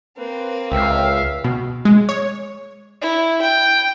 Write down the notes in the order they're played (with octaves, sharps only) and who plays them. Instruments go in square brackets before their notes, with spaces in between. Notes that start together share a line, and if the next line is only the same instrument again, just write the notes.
[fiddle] A#3 C4 [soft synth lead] B4
[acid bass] C#2 [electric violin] E5 F5 [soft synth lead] G5
[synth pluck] B2
G#3
C#5
[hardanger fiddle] E4
G5